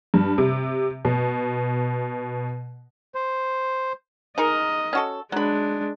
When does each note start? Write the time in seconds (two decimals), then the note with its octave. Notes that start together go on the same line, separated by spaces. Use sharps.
0.14 G2
0.38 C3
1.05 B2
3.15 C5
4.38 D#4 G#4 A#4 D#5
4.93 C#4 F#4 A4
5.32 F#3 G#3 D4 B5